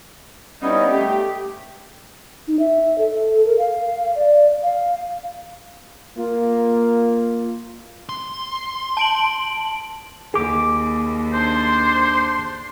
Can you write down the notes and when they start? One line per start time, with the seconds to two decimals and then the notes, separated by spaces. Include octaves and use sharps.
0.62 G3 B3 C#4 D#4 E4
0.91 A3 G4 G5
2.48 D#4
2.59 E5
2.98 A4
3.45 A#4
3.58 F5
4.15 D5
4.63 F5
6.18 A#3 F4
8.09 C6
8.97 A5 D7 F#7
10.34 D#2 G#4 D6
11.34 D4 C5 C6